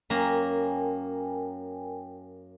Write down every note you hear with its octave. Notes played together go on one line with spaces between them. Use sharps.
F#2 A#3 A#4 G5 G#5 A#5